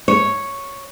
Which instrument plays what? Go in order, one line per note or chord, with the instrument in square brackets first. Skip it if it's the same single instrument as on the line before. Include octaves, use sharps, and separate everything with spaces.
[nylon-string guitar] C#5